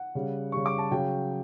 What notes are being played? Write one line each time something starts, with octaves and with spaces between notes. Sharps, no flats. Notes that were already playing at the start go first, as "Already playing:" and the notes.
Already playing: F#5
C#3 G3
C#3 G3 C#6
D6
A5
C#3 F#3 G5